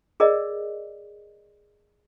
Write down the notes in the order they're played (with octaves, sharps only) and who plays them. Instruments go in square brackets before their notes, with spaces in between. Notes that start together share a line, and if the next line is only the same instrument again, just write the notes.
[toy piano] G#4 A#4 D5 D#5